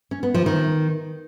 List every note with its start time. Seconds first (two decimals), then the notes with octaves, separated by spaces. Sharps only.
0.11 C#4
0.23 B3
0.34 F3
0.46 D#3